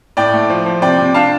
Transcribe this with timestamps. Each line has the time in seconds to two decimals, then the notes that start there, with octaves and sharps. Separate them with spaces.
0.17 A2 D5 G5
0.33 A3
0.50 F3
0.66 F3
0.82 C3 D5 G5
0.98 C3
1.14 D4 F5 A5